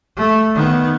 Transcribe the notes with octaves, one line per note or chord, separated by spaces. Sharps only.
A3
D#3 B3